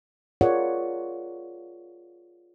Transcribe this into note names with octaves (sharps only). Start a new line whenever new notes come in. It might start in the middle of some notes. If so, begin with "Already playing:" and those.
F4 G#4 A#4 C#5 D5 F#5